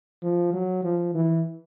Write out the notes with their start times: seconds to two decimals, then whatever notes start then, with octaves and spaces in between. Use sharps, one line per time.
0.22 F3
0.53 F#3
0.83 F3
1.14 E3